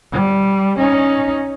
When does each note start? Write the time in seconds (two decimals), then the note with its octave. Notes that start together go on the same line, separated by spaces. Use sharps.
0.12 G3
0.79 C#4 D#4